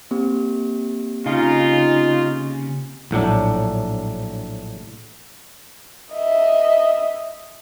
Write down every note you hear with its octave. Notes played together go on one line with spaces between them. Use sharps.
A#3 C4 G4
C#3 D#4 F4
A#1 A2 F#3 D4
D#5 E5